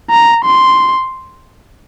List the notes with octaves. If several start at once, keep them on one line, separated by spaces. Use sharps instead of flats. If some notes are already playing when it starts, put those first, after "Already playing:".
A#5
C6